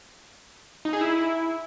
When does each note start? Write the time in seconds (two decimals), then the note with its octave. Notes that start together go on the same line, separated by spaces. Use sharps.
0.85 D#4
0.93 G#4
1.01 E4